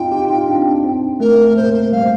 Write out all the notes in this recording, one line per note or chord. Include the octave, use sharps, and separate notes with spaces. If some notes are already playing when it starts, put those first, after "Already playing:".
Already playing: C4 D#4 F4 G5
G4
F4
D4
C4
D4
C4
A3 A#4
A3
A#3 C5
C5
G3 F5